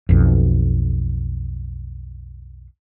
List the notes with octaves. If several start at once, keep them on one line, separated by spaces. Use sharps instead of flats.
B1 F2